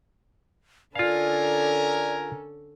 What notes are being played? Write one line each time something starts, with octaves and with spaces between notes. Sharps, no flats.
D3 C#4 F4 A4 A#4 D5 F5 G#5